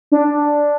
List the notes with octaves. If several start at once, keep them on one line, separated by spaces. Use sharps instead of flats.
D4